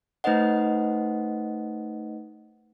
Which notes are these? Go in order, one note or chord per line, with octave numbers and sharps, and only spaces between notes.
A3 D#4 B4 C5 D#5 F#5